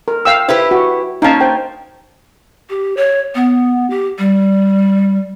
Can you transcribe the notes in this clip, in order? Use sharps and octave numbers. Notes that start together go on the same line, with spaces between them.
A#4
F5 G5 E6
E4 G4 B4 C5
F#4
A#3 C#4 D#4 F5 A5
C5 G5
G4
C#5
B3
G4
G3